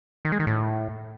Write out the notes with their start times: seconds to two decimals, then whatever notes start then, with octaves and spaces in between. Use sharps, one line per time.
0.25 D#3
0.32 G#3
0.40 D#3
0.47 A2